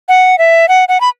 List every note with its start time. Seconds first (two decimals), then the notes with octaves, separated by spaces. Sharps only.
0.09 F#5
0.38 E5
0.69 F#5
0.89 F#5
1.01 B5